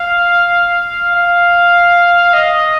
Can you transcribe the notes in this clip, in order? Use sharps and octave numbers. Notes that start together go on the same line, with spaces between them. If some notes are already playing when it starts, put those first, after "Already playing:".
Already playing: F5
F5
D#5